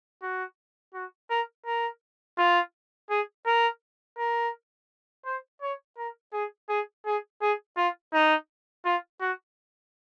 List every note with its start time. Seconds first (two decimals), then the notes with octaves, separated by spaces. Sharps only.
0.22 F#4
0.94 F#4
1.30 A#4
1.66 A#4
2.38 F4
3.10 G#4
3.46 A#4
4.18 A#4
5.26 C5
5.62 C#5
5.98 A#4
6.33 G#4
6.69 G#4
7.06 G#4
7.41 G#4
7.77 F4
8.13 D#4
8.85 F4
9.21 F#4